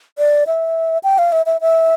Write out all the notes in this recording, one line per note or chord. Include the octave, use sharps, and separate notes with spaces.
D5
E5
G5
F5
E5
E5
E5